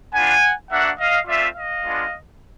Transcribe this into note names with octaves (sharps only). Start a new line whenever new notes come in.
B3 D4 F4 F#5 G#5
A#3 D4 F#4 E5 F#5
D#5 F5
A3 C4 F4 D5 E5
D#5 F5
G#3 B3 D4 F4